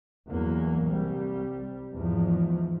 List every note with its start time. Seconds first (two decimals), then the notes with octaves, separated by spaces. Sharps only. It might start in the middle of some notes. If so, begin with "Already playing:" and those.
0.28 E2 G2 E3 F#3 A#3
0.83 C2 G3
1.93 E2 G#2 F3